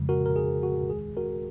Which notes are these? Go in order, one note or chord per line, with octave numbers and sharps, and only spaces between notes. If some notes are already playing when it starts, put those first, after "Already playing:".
Already playing: F2 C#3 F3 G#3
F#4 A#4
A#4
G#4
F#4
D#2 D#3 G#3 G#4
F#4 A#4